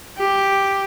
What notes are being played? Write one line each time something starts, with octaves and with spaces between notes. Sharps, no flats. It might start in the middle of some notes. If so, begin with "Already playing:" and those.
G4